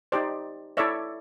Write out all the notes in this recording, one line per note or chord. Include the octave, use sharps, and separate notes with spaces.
D#4 G4 C5 D5
E4 A4 C#5 D5 E5